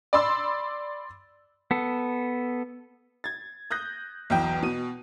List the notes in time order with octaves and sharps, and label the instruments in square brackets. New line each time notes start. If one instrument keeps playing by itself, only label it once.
[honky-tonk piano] D5 B5 C6 E6
[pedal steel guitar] B3 A4
[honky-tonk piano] G#6 A6
D#6 F#6 G6 A#6
B1 E2 G5
B2 D#7